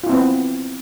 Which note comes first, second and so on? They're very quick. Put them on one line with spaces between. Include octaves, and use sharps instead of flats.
F4 E4 C4 B3